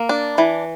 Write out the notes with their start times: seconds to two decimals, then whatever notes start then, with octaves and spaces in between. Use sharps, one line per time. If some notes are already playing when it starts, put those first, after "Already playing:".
Already playing: A#3
0.09 D4
0.38 E3